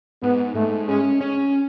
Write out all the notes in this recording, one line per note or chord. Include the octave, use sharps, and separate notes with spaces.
G#2 B3
G#2 A3
G#3 C#4
C#4